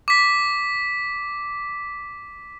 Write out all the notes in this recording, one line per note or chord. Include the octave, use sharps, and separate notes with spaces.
D6 B6